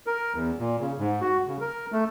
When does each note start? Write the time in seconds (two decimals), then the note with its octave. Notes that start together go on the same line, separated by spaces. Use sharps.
0.07 A#4
0.35 E2
0.59 A#2
0.80 C#3
0.99 G#2
1.21 F#4
1.48 C#3
1.61 A#4
1.92 A3